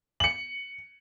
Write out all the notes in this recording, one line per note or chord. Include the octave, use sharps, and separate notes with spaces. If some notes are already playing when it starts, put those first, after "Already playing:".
C#7 F#7